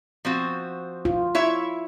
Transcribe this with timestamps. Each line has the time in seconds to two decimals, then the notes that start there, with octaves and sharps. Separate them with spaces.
0.25 F3 C4 F#4
1.05 F4
1.35 E4 C#5 E5